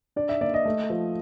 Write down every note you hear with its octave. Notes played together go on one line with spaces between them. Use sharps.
D4 D5
E5
A#3 D5
D#5
A3
F3